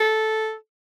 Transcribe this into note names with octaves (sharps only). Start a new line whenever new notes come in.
A4